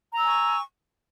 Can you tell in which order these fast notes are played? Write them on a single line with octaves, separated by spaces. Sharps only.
A#5 E6 G#5 C#6